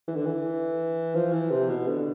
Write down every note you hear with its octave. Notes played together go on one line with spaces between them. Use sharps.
E3
D3
E3
F3
E3
C3
B2
D3